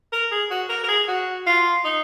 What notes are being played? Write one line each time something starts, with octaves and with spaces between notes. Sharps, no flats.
A#4
G#4
F#4
A#4
A#4
G#4
F#4
F4
D#4